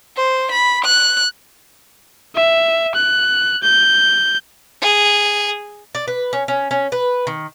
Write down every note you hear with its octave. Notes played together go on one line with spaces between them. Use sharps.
C5
B5
F#6
E5
F#6
G6
G#4
D5
B4
C#4
C#4
C#4
B4
D#3